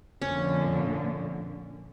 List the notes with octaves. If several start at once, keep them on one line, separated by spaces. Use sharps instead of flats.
F2 A#2 D3 C#4